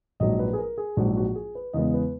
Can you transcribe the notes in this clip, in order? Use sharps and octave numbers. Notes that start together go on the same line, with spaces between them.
A#1 G#2 F#3 D#5
B4
G#4
A#4
G#4
A#1 G#2 F#3 F#4
F#4
G#4
B4
E2 C#3 G#3 B3 D#5
B4